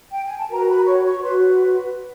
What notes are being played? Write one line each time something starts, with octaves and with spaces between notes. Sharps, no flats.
G5
G#5
A5
F#4 A#4 B4 A#5
B4 B5
C#5 C#6
C#5 C#6
F#4 B4 C6